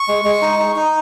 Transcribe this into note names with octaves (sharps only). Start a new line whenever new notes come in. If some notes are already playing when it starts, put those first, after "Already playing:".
Already playing: C#6
G#3
G#3
D#4
D#4
D#4